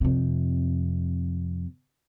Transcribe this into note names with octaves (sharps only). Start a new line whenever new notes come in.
F2 C3